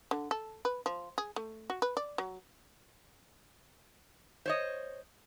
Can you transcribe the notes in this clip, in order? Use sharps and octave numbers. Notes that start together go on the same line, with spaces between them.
D3
A4
B4
F3
G#4
A3
F#4
B4
D5
F#3
C5 C#5 D#5